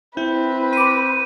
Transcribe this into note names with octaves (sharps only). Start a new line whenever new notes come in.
C4 E4 B4 G6
C6 D6 D#7